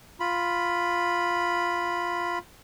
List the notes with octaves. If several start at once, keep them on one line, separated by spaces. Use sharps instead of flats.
F4 B5